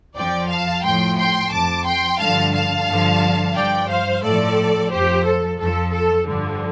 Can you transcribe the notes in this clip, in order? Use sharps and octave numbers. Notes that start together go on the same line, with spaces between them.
F2 F3 D5 G5
F5 A5
A2 F3 G5 C6
G5 C6
F2 F3 A5 D6
G5 C6
G2 D3 F3 F5 A5
F5 A5
G2 D3 F3
G2 F3 D5 G5
C5 F5
A2 F3 A4 D5
F2 F3 G4 C5
A4
F2 F3 A4
A4
G2 D3 F3